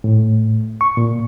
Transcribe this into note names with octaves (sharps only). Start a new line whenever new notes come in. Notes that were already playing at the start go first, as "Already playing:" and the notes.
A2
C#6
A#2